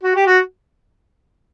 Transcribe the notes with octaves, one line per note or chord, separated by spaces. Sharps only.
F#4
G4
F#4